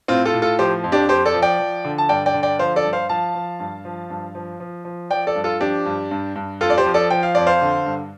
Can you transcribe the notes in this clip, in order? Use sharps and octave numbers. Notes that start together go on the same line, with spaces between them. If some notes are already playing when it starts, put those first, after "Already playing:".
A2 C4 F4
F4 A4
A2
F4 A4
F3 G4 C5
F2
D4 G4
F2 G4 C5
A4 D5
F3
D5 G5
F3
D3
A5
G2 D5 G5
D5 G5
D3
D5 G5
F3 C5 F5
A4 D5
G2
C5 F5
F3 F5 A5
F3
G2
F3
G2
F3
F3
F3
F3 D5 G5
A4 D5
G2
F4 A4
F3 D4 G4
G2
G2
G2
F2 F4 A4
D5
G4 C5
F3
A4 D5
F3 G5
F5
F2 D5
C5 F5
D3
G2